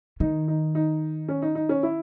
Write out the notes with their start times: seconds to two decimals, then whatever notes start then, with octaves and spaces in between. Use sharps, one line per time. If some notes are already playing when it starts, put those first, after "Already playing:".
0.20 D#3 D#4
0.48 D#4
0.75 D#4
1.28 C#4
1.42 D#4
1.55 D#4
1.69 C#4
1.83 E4